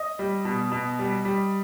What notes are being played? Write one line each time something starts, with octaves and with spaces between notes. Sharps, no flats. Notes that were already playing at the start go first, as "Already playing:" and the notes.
Already playing: D#5
G3
B2
B2
G3
G3